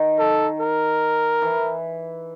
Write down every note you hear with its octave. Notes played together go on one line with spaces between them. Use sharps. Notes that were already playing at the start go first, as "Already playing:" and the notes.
Already playing: D#3
A4
A#4
E3